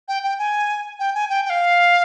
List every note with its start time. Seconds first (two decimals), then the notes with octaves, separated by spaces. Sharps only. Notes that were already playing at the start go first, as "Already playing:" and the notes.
0.08 G5
0.24 G5
0.39 G#5
1.00 G5
1.15 G#5
1.30 G5
1.45 G5
1.50 F5